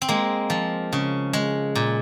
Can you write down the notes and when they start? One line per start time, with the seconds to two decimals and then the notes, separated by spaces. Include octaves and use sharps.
0.02 C4
0.09 G#3 A#3
0.50 F3
0.93 C#3
1.33 G#3
1.75 A#2